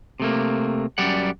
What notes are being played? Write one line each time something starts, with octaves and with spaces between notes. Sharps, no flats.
C3 A3 A#3
F#2 G3 D5 F#5